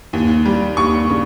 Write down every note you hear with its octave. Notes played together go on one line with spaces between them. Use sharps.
D#2
G3
D#2 C#6
C#3